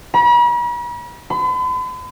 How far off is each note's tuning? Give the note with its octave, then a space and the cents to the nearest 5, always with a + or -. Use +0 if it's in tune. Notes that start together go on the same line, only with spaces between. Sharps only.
B5 -45
B5 +45